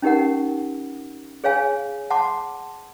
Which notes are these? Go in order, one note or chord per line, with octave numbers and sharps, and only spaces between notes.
C#4 D#4 G4 A#4 F#5
G#4 C#5 F5 G#5
F#5 A5 C6 D6